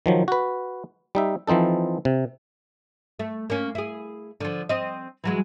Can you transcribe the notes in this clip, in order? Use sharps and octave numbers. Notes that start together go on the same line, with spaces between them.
D#3 F3 F#3
F#4 B4
G3 D#4 E5
E3 F3 C4 D#4 A4
C3
A3
A#3 C#4
E4 G#4
D3 F3
C4 D#5
E3 F#3 G#3